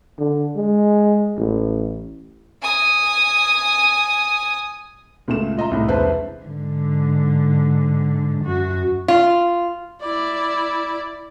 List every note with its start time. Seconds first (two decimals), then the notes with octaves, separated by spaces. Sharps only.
0.18 D3
0.56 G#3
1.37 A1
2.62 G#5 D#6
5.28 C#2 A#2 A3 E7
5.57 F4 D#5 E5 A#5
5.71 C2 A2
5.88 E1 C2 E4 B4 C5 A5
6.44 G#2 D3
8.42 F#2 F#4
9.08 F4
10.01 E4 D5